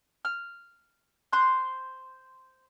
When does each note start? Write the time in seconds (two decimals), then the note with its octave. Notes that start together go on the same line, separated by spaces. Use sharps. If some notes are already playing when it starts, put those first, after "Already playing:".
0.25 F6
1.33 C5 C6 F#6